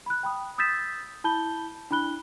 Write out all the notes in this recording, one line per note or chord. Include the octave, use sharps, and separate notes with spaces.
B5 F#6
G5 B5 D#6
D#6 E6 G6 A6 B6 E7
E4 A5 B5 G6 G7
D4 E4 B5 F#6 G7